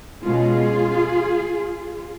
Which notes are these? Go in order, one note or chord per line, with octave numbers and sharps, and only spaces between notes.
B2 G#3 C#4 F4 G#4